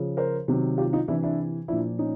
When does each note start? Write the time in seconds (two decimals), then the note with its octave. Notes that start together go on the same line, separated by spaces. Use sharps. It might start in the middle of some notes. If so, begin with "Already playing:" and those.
Already playing: C#3 F3
0.17 A#4 C5
0.48 C3 D#3 F#3
0.78 F4 G4
0.93 D#4 F4
1.08 C3 E3 D4 E4
1.23 D4 E4
1.68 A#2 F3 D4 E4
1.99 C#4 D#4